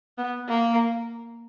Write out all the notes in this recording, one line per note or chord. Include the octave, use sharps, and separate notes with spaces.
B3
A#3